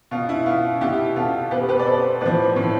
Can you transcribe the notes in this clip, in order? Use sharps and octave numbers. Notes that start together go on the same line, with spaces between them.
B2 F4
E4
B2 F4
B2 E4 G4
B2 F4 A4
B2 G4 B4
G4 B4
D5
B2 A4 C5
A2 F3 B4 D5
A2 F3